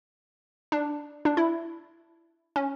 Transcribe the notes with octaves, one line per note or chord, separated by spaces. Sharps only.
D4
D4
E4
C#4